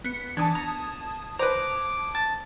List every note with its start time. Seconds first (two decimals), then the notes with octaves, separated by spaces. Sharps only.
0.04 B3 C#7
0.37 E3 D4 A5 D#6 G#6
0.55 A#5
1.39 B4 C5 A#5 D6
2.15 A5